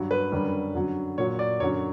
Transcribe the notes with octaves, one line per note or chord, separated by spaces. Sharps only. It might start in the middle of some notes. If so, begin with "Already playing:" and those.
Already playing: G2 F#3
B4
F#2 D3 G3
F#2 D3 F#3
A#2 F#3 C#5
D5
F#2 D3 F#3 C#5